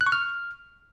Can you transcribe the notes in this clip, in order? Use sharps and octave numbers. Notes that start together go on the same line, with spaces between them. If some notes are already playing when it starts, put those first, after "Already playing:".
F#6
C#6
F6